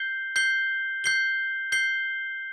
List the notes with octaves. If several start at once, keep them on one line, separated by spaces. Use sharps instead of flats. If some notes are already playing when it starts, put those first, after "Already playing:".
Already playing: G6 C7 G7
G6 C7 G7
G6 C7 G7
G6 C7 G7